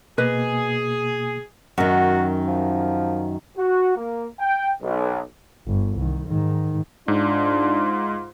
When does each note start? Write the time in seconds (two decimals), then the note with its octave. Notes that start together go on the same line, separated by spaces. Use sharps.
0.18 B2 A#3 G#4 B4 D#5
1.78 F#2 D#3 F#4
2.48 F3
3.57 F#4
3.96 A#3
4.40 G5
4.82 B1
5.66 G1
5.96 C2 D#3
6.26 G#2 D#3
7.08 G#2 D4 F4